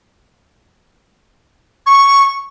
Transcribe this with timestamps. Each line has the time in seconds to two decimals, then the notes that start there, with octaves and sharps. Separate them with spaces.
1.86 C#6